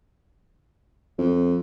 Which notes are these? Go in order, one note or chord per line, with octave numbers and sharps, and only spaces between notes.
F2